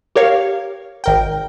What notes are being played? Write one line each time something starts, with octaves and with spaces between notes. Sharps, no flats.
G4 A#4 C#5 F5
G#1 A#4 G5